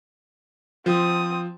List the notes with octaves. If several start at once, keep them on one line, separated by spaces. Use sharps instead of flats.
F3 C4 D#6